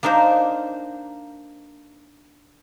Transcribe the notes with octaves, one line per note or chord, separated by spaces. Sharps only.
A#3 D4 D#4 A#4 C5